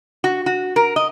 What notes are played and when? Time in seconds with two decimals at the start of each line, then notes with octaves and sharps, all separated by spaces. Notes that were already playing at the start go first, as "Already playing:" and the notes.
0.24 F#4
0.46 F#4
0.76 A#4
0.96 D#5